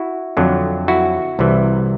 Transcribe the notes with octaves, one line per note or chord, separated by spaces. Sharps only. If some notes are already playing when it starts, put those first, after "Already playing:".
Already playing: E4 F#4
F2 D3 F#3
E4 F#4
C2 C3 E3